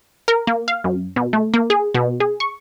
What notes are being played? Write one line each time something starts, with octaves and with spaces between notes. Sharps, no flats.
A#4
A#3
F5
F#2
B2
A3
A#3
G#4
B2
G#4
C#6